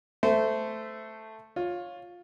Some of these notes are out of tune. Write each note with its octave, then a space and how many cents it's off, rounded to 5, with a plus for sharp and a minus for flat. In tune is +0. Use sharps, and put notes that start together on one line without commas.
A3 +0 C5 -20 E5 +0
F4 +15 C#5 +0